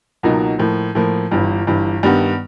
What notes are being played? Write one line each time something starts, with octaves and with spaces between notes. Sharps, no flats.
C#2 B2 F#3 A#3 D#4
A2 F3 A#3
A2 F3 A#3
G1 G2 E3
G1 G2 E3
G2 D#3 G3 B3